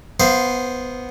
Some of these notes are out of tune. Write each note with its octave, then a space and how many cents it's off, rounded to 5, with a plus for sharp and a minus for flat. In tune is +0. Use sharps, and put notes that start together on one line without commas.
B3 +0 C5 +0 F5 -25